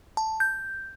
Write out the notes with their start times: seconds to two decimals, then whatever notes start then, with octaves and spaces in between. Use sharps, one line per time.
0.17 A5
0.40 G6